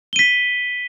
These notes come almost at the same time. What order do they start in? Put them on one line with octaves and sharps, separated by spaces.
G7 D#7 B6